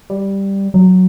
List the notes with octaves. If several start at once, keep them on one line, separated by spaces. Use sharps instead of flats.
G3
F#3